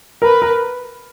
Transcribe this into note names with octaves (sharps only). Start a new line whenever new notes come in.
A#4 B4
A#4